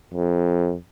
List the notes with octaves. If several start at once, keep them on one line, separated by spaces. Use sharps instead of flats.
F2